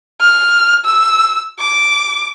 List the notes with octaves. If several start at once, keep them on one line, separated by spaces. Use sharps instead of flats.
F6
E6
D6